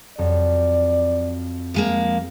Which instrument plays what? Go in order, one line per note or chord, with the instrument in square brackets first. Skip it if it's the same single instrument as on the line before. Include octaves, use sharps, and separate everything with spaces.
[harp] F2 F#3 [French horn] D5
[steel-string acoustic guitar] F3 G#3 A#3